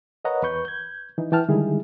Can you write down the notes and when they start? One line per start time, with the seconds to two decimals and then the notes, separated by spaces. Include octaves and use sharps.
0.25 A#4 B4 C#5 D#5 F#5 A#5
0.42 E2 B4 C#6 G6
0.65 G6 G#6
1.18 E3 D#4
1.32 E3 G5 A5 F6
1.49 D3 D#3 G3 G#3 E4 G#4